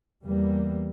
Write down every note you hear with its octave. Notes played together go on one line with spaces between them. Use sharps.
E2 E3 G3 A#3